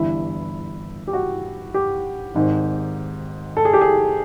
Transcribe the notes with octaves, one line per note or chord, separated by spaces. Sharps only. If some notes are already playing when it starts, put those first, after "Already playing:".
Already playing: G1 G2 E3 E4
G4
F#4
G4
G#1 G#2 D#3
A4
G#4
G4
G#4